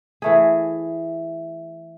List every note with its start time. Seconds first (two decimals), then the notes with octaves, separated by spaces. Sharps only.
0.22 E3 A3 G#4